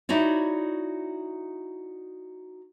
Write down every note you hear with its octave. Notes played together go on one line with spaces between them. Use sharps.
D#4 E4 F#4 C#5 D5